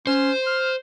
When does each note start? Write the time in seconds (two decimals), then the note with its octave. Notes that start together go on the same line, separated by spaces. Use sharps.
0.07 C#4 C5
0.47 F6